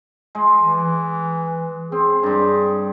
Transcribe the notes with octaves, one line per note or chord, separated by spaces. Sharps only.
G#3
E3
C4 G#4
G2 G3